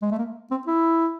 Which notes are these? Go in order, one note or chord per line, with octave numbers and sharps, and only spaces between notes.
G#3
A3
A#3
C4
E4